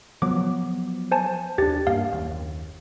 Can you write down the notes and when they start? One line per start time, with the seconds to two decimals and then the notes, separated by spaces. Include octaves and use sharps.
0.22 F3 F#3 B3 D6
1.12 C5 G#5 A5
1.58 D#2 D4 G4 A6
1.87 G2 A#3 F5
2.12 F#1 D#2